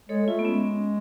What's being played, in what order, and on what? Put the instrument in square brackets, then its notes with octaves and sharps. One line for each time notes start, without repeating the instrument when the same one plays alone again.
[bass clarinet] G#3 [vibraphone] A4 C#5
[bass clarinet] A3 [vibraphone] F4
[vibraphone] B3
[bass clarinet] G#3 [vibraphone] C#4